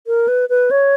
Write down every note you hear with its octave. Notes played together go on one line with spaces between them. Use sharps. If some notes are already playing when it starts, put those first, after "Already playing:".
A#4
B4
B4
C#5